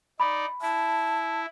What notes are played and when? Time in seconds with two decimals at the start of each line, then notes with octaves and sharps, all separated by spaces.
0.20 D#4 D5 B5
0.62 E4 A5